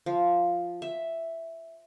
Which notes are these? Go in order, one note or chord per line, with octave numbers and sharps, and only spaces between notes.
F3
E5